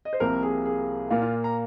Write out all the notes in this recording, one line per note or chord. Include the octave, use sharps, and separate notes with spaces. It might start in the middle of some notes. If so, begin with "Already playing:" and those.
D#5
C5
C2 C3 F3 A#3 A#4
G#4
G#4
A#2 A#3 F4
F4
A#5